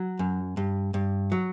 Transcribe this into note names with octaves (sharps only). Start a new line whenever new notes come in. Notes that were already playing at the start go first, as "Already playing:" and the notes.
Already playing: F#3
F#2
G2
G2
F#3